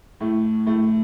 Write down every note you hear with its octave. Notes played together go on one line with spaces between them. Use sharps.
A2 A3
A2 A3